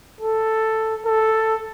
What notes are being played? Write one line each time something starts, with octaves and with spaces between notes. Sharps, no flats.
A4
A4